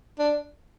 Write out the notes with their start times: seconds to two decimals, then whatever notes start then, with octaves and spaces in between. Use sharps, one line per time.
0.19 D4